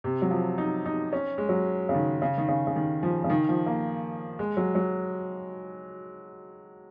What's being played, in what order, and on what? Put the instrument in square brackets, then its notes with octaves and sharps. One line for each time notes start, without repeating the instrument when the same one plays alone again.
[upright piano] C3
F#3
F3
D#4
D#4
C#4
G#3
F#3
C#3
D#3
C#3
D#3
C#3
C#3
D#3
F3
C#3
D#3
F3
A#3
G#3
F#3
F#3